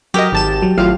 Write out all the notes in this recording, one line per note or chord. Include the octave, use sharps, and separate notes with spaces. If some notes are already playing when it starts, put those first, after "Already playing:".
F#3 G4 A#4 D#5
G#1 A5 E7
F#3
G#1 A2 F#3 F4 F5